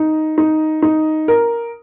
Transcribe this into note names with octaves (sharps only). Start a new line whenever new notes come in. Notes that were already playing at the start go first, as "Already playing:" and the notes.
Already playing: D#4
D#4
D#4
A#4